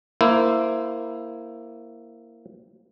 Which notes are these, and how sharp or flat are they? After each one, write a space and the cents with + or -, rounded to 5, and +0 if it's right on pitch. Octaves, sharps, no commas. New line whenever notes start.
A#3 -5 E4 +10 C5 -10